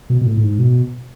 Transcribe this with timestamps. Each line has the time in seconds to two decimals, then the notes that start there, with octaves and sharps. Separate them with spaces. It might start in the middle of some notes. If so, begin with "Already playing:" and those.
0.10 B2
0.21 B2
0.26 A2
0.37 A2
0.42 G#2
0.59 B2